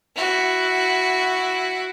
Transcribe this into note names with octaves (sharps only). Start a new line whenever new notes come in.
E4 F#4